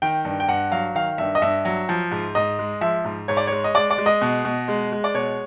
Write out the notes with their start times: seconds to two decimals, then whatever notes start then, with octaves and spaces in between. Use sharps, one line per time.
0.02 D#3 G5
0.25 G2
0.40 G5
0.48 G2 F#5
0.71 F#3 F5
0.95 D#3 F5
1.18 G2 E5
1.35 D#5
1.42 G2 E5
1.65 F#3
1.89 F3
2.11 G#2
2.35 G#2 D#5
2.59 G#3
2.81 F3 E5
3.05 G#2
3.28 G#2 C#5
3.37 D5
3.47 G#3 C#5
3.64 D#5
3.75 G#3 D5
3.91 D5
3.98 G#3
4.06 D#5
4.21 B2
4.45 B2
4.68 G#3
4.92 G#3
5.04 D5
5.14 B2 C#5